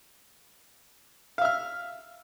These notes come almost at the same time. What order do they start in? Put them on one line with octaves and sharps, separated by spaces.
F5 E5 F6